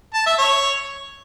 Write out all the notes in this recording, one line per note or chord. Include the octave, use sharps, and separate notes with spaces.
A5
E5
C#5